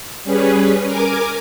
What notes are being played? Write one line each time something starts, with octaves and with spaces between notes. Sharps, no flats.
G3 C#4 G#4 B4
A#4 G#5 D6